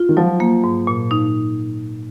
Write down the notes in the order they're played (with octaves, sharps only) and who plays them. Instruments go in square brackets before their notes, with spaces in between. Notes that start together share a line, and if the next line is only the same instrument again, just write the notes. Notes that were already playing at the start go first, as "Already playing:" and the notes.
Already playing: [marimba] F4
[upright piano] D#3
[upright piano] F3 [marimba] F#3
[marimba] A#3
G#2
A#2
D#4